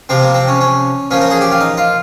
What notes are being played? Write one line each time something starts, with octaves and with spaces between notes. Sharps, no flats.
C3 F3 C4
A#3
C4
C#4
C#4
A#2 F3 C#4
A#4
G#4
G4
F4
D#4
F4